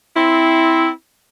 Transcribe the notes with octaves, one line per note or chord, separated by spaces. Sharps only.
C4 E4